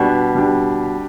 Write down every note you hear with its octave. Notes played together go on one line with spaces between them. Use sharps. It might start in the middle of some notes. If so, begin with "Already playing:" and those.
Already playing: B2 G3 D4 G4
G3 D4 G4